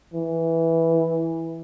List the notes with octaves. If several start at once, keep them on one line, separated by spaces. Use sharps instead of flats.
E3